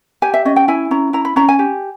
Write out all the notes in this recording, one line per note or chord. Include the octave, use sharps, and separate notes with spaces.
G4 G#5
E5
C#4 D#5
G5
E4 G#5
C#4 A#5
E4 A#5
B5
C#4 A#5
G#5
G4